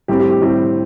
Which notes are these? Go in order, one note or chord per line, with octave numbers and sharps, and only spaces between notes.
A2 G3 C4 G4
G4
G4
A2 G3 C4